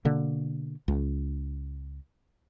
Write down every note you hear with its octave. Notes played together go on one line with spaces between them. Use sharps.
B2 D3 A#3
C#2